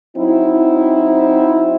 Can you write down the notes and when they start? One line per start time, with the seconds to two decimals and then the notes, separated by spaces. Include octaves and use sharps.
0.17 F#3 C4 D#4 E4